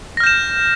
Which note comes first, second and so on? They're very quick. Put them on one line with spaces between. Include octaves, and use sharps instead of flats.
A#6 F6 G6 E7